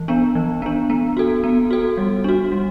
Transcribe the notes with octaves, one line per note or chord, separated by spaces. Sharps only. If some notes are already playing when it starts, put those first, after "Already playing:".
Already playing: E3
B3 D4
E3
B3 D4
B3
F#4 A4
B3
F#4 A4
G3
D4 F#4
G3